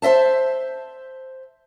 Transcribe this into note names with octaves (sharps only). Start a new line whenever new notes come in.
C5 D#5 E5 A5